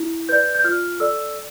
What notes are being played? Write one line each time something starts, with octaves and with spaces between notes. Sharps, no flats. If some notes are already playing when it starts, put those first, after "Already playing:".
Already playing: E4
B4 D5 G6
G6
F4 F6
A4 D5 E6